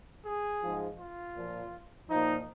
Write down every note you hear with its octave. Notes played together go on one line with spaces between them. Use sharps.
G#4
G#2 F3
F4
A#2 F3
A#2 F3 D#4